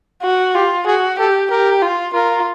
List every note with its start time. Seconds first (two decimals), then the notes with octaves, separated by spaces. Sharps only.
0.22 F#4
0.54 F4 G4
0.86 F#4 G#4
1.19 G4 A4
1.51 G4 A#4
1.82 F4
2.13 F4 A#4